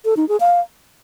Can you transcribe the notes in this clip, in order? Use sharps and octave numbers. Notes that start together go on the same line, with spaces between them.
A4
D#4
G#4
F5